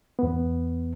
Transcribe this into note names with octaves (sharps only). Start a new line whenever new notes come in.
E2 B3